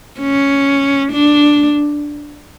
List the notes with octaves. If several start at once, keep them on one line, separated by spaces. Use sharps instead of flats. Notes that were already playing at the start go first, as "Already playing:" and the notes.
C#4
D4